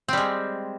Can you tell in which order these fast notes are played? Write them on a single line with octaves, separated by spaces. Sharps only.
C4 G3 G#3